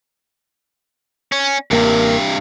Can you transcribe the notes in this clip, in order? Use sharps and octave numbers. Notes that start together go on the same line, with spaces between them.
C#4
A1 G2 C3 A#3 A#4